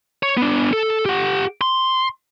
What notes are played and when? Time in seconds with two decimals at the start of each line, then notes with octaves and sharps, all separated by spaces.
0.23 C#5
0.37 B3 D4
0.73 A4
1.06 G4 F#5
1.61 C6